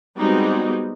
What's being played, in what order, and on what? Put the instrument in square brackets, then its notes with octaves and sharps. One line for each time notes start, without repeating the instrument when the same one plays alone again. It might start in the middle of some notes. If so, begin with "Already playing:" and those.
[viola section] G3 G#3 B3 C4 D#4 F#4